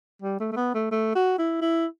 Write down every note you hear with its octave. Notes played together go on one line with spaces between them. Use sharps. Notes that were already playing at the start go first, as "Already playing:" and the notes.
G3
A3
A3
B3
A3
A3
F#4
E4
E4